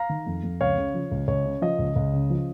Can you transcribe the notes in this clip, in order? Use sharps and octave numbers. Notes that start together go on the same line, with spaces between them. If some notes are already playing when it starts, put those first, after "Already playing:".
Already playing: F5 A#5
D#3
F2
F2
C#2 C#5 F5
C#3
F3
C#2
C#2 C#5
C#3
F3 D#5
C#2
C#2
C#3
F3